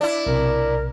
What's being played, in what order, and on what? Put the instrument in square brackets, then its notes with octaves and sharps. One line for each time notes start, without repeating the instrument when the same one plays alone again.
[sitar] D4 E4
[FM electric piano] B1 C3 [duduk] A#4